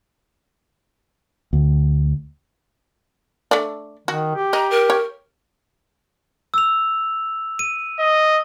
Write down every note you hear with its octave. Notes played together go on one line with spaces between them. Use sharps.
D2
A3 D4 D5
D#3 F#4
G4
D#5 A#5
A#4
C#5
E6 F7
D#7
D#5